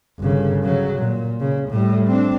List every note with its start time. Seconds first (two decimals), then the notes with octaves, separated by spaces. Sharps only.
0.19 G1 C#3
0.62 C#3 F#3
1.00 A#2
1.40 C#3
1.70 A2 G3
2.07 C4 D4